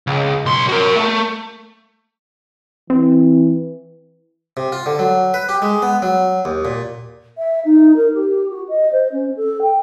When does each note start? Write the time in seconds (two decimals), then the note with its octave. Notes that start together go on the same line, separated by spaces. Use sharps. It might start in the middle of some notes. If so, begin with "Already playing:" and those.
0.07 C#2
0.45 B1 C6
0.69 F#4 A#4
0.96 A3
2.90 E3 C4
4.57 C3
4.72 F4
4.86 D3
4.99 F#3
5.34 B4
5.49 G4
5.62 G#3
5.82 B3
6.02 F#3
6.45 D#2
6.65 A#2
7.38 E5
7.65 D#4
7.96 A#4
8.14 G4
8.50 F#4
8.69 D#5
8.92 C5
9.12 C#4
9.37 A4
9.62 G5